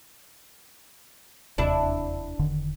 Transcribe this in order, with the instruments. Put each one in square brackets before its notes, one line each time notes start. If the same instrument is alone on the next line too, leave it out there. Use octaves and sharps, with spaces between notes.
[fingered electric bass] E1 D#2 C3 [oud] D4 E4
[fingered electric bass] E1 D3 D#3